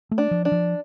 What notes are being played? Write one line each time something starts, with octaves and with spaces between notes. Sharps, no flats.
A3
D4
F3
D4
F3